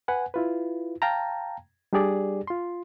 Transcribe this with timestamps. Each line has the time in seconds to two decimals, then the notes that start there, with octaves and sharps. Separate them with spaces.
0.08 B4 F#5 G#5
0.34 E4 F4 B4
1.02 F5 G5 A5 A#5
1.93 G3 D4 G4 G#4 D5
2.47 F4 C6